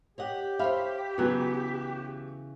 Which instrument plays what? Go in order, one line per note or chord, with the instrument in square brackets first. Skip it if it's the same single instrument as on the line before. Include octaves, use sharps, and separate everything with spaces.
[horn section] G4 [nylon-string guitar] C#5 D#5 F#5
[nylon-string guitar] C5 C#5 F5 [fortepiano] E5 B5
[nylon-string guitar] C#3 E3 [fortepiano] F#3 B3